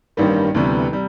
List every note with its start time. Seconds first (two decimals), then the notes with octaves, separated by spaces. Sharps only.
0.17 A1 G2 D#3 G3 A#3
0.55 D2 C3 E3 G3 B3
0.92 C3 G3